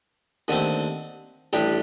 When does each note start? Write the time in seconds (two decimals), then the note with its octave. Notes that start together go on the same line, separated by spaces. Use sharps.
0.48 D#2 D3 A3 C4
1.53 A1 A2 G3 D4 G4